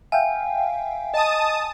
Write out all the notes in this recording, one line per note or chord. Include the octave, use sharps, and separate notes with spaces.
E5 F5 G5 G#5
D#5 A5 D#6